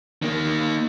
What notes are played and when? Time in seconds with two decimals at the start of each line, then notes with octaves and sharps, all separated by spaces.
0.22 D#3 A#3